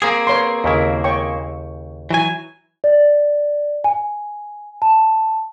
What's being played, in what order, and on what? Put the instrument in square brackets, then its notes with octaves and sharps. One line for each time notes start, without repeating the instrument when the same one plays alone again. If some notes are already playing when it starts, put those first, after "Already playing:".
[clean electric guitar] A#3 C4 G#4
[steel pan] B4 C#5 C6
[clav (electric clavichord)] D#2 C#3 E4
[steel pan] C#5 G5 C#6
[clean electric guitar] E3 F#3 G#5
[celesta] D5
G#5
A5